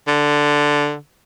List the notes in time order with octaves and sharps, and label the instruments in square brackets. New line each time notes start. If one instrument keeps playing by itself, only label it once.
[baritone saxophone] D3